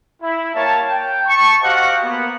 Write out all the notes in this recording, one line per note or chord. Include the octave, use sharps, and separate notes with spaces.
E4
G3 A#3 C#5 A5
G5
A5 C#6
F#4 G4 C5 D#5 F5 F#5
A#3 B3